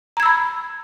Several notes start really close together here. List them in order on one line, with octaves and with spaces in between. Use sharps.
A#5 G#6 E6 B5